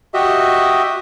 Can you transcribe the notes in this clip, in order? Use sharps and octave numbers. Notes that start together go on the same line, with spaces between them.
F#4 G4 D#5 E5